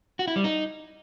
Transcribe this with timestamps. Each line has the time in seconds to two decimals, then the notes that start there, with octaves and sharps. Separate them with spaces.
0.19 F#4
0.28 E4
0.36 G3
0.44 D#4